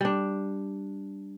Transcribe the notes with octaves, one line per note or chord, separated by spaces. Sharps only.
G3 D4